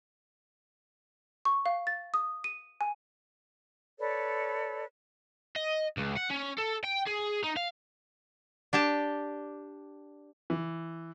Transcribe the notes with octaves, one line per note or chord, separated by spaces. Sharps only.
C#6
F5
A6
D#6
D#7
G#5
A4 B4 C#5 D5
D#5
C#2
F#5
C#4
A4
G5
G#4
D#4
F5
D4 G4 G5 A5
E3